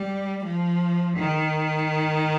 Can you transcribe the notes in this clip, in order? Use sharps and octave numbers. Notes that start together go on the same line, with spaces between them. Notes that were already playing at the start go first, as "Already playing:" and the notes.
Already playing: G3
F3
D#3